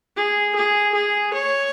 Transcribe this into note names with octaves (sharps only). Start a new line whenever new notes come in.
G#4
G#4
G#4
C#5